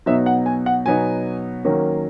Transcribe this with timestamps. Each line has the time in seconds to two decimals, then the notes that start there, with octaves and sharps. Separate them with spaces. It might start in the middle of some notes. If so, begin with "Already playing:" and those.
0.06 B2 F#3 B3 D#4 E5
0.26 F#5
0.46 G#5
0.66 F#5
0.86 B2 F#3 B3 D#4 G#5
1.64 D#3 F#3 A#3 C#4